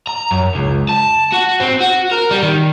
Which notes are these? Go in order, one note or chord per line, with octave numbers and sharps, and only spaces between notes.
A#5
F#2
C#2
A5
F#4
C4
F#4
A#4
G3
D#3